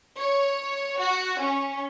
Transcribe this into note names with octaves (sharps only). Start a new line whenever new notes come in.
C#5
F#4
C#4